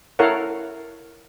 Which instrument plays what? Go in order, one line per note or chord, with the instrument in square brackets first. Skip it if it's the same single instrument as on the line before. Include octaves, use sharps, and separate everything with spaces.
[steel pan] E4 A4 A#4 C#5 F5 F#5